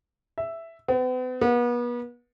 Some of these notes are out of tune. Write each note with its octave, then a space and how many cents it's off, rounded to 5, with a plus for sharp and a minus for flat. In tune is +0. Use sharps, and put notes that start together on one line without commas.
E5 +5
B3 +45
B3 -35